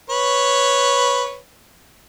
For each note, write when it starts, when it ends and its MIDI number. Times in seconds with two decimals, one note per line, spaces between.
0.10 1.38 71
0.10 1.38 73